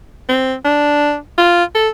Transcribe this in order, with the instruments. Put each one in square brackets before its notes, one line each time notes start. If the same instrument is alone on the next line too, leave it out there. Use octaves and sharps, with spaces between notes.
[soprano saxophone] C4
D4
F4
A4